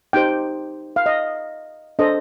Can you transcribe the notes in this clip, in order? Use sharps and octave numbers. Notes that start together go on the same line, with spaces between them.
D#4 G4 C5 G5
F5
D#5
D4 A4 C5 D#5